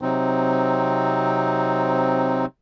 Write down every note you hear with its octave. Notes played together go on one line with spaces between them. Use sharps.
C3 F#3 C4 D#4